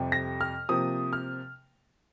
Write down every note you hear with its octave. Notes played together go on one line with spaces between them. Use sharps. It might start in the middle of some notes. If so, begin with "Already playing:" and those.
Already playing: F2 C3 G3
A#6
F6
C3 F3 A#3 D#6
F6